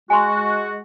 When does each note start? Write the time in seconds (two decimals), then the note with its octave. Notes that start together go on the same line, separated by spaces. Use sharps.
0.10 G#3 F#4 G#5 C6